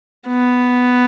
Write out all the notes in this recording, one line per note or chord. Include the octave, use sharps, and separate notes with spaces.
B3